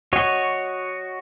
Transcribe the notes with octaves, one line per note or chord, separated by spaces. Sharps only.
F#4 C#5 D#5